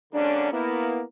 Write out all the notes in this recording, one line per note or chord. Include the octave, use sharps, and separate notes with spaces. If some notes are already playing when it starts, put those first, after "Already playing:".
G#2 D3 F#3 A#3 C#4 D4
A#3 B3 E4